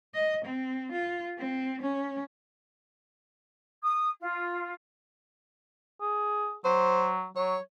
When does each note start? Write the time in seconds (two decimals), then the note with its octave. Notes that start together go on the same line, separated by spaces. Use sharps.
0.14 D#5
0.46 C4
0.92 F4
1.38 C4
1.82 C#4
3.83 D#6
4.21 F4
6.01 G#4
6.65 F#3 C5
7.36 F#3 C#5